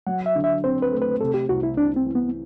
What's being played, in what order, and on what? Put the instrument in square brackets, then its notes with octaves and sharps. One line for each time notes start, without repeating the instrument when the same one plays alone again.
[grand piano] F#3 [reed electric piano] F#5
[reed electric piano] E5
[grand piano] D3
[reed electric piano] E5
[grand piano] C4 [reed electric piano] C5
[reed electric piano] B4
[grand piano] A3
[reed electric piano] B4
[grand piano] C3 [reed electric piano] A4
[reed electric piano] G4
[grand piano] C2 [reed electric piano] F#4
[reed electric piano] E4
[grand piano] C2 [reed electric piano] D4
[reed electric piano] C4
[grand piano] E3
[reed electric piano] B3